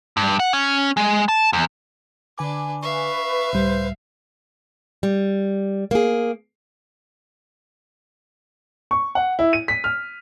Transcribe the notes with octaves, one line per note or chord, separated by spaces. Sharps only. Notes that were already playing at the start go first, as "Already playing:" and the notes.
G2
F#5
C#4
G#3
A5
E2
D3 D4 B4 G#5 D6
B4 E5 F5 C#6
C#2 A2 G3 C5
G3
A#3 G#4
C#6
F#5
E4
D#7
B6
F6